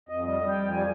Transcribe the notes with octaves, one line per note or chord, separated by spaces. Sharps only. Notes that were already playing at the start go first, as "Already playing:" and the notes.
F2 D#5
G3 D#5
G3
G5
F2
G3 G#5